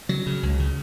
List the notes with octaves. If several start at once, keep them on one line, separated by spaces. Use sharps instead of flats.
C#3 F#3
C#3
C#2
C#3